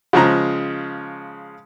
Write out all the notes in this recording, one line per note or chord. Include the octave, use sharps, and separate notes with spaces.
C#3 F3 G#3 A#5